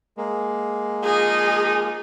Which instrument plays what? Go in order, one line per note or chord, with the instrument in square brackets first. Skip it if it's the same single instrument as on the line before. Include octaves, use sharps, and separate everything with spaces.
[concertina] G#3 A#3
[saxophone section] F3 D#4 D#5 [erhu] G#4